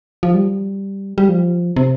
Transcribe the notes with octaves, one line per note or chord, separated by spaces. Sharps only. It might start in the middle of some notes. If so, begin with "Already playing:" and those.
F3
G3
G3
F3
C3